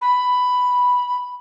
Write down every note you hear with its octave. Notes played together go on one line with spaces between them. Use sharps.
B5